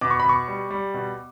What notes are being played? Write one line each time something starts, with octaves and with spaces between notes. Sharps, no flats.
B2 D6
C#6
B5
B2 C#6
G3
G3
B2